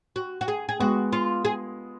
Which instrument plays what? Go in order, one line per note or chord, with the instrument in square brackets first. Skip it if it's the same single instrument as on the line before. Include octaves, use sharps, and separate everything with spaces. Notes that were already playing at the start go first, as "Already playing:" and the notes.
[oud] F#4
F#4
G#4
G#4
[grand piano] G#3 B3 [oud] F#4
[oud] F4
G#4